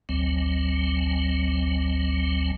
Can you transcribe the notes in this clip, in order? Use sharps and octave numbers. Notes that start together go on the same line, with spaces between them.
G#1 D2 F#3 C4